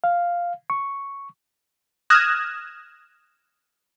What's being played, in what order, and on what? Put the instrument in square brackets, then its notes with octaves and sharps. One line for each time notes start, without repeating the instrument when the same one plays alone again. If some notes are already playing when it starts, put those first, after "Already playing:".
[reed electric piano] F5
C#6
[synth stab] D#6 F6 F#6 G#6 A#6 E7